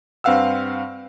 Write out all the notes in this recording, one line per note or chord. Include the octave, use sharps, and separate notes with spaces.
G2 C4 B4 F5 F#5 E6